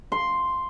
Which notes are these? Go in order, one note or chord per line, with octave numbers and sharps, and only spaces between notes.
C6